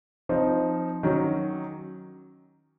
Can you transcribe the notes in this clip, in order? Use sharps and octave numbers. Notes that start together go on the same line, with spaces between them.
F3 C4 D#4
D#3 F#3 C#4